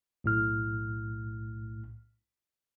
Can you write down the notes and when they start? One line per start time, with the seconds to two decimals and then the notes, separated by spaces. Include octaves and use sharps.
0.24 B1 A2 F6